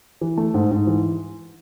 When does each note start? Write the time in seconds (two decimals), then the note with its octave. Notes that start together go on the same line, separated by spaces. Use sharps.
0.21 E3
0.38 A3
0.54 G#2
0.71 G#2
0.87 E3